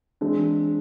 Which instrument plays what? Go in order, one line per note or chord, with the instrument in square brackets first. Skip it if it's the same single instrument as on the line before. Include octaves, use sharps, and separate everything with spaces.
[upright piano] E3 G#3 [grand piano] C4 D4